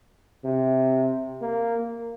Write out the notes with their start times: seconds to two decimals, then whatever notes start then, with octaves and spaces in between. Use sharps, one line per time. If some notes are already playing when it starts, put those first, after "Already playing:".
0.45 C3
1.42 A#3